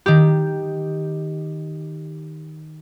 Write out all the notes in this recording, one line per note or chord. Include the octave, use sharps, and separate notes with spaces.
D#3 G4